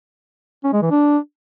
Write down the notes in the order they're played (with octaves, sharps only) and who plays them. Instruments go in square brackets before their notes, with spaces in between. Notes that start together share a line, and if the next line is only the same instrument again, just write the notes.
[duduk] C#4
G#3
E3
D4